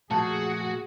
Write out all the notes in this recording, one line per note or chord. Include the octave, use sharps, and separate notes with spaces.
A#2 F3 A3 F#4 G#4 A5